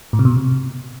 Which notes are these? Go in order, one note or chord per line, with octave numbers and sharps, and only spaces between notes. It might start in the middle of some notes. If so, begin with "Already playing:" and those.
A2
C3
B2
A2
C3